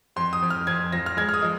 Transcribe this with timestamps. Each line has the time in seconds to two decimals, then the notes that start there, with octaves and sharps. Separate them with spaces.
0.16 F2 C6
0.33 D#6
0.42 F2
0.50 F6
0.67 F2 G#6
0.93 F3 A#6
1.06 F6
1.17 G#3 G#6
1.29 F6
1.34 D#6
1.42 F3 D#5